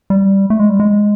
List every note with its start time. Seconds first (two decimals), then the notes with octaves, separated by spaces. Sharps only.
0.10 G3
0.50 A3
0.59 G#3
0.69 G3
0.80 G#3